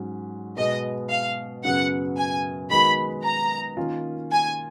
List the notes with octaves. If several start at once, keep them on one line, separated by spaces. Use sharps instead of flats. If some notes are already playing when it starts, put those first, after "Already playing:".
Already playing: G#2 F#3 C#4
B2 G#3 B3 D#5
F5
F#2 C#3 F#3 B3 F#5
G#5
D#3 G#3 B3 D#4 F#4 B5
A#5
D#3 A#3 C#4 F4
G#5